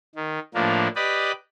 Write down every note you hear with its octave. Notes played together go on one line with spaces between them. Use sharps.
D#3
A2 F3 A#3 D4
G4 B4 D5 D#5 B5